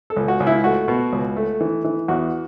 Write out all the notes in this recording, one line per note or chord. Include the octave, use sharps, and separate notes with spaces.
A4
C#2
F#4
C#2
E4
A3 F#4
B2
C#2
A3
E3
E3
E2 F#4